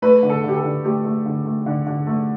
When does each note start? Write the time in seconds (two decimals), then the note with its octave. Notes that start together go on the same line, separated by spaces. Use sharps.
0.02 A3 B4
0.23 D3
0.30 A4
0.44 D3 G4
0.57 A4
0.64 D3
0.84 A3 G4
1.05 A3
1.26 D3
1.46 A3
1.66 D3
1.87 D3
2.07 A3